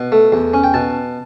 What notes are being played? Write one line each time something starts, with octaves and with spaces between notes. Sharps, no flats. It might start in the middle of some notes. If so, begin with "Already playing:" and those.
Already playing: B2
A3
E2
C#4
G5
B2 A5